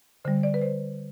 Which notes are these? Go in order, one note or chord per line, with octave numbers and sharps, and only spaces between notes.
D3 G3 C5
D5
B4
C5